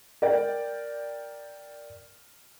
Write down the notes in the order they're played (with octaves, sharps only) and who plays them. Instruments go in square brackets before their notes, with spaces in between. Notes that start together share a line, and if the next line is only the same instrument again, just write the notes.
[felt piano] A#4 D5 G5